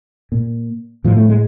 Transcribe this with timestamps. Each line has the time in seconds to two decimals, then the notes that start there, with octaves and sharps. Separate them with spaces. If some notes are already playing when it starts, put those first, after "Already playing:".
0.32 A#2
1.04 A2 F3
1.17 A3
1.29 G#3